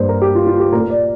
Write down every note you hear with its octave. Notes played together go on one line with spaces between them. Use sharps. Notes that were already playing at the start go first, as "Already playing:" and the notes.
Already playing: G2 G3 A#3 C5
A#4
G4
F4
F4
G4
A#2 A#3 A#4
D5